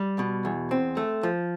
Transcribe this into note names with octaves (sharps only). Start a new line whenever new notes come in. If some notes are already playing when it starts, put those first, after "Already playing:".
Already playing: G3
B2
E2
C4
A3
F3